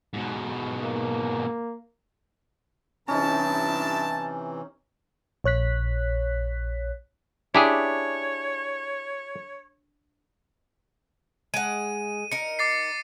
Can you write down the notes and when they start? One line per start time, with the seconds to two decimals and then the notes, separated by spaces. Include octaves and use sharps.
0.13 G#2 B2
0.83 A#3
3.08 G2 C3 E3 C4 C#4 D#4 E4 A5
5.44 A#1 C#5 F#6 B6
7.55 D4 E4 G4 G#4 C#5
11.54 G#3 F#5 D#7
12.32 D#4 A#4 C#7
12.59 D6 A6 C7